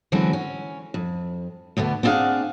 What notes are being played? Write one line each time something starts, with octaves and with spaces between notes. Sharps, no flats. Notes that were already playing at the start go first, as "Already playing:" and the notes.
D3 E3 F#3 G#3 C4 C#4
C#4
F2
D2 B2 D3 B3
B3 C4 D4 G#4 F5 F#5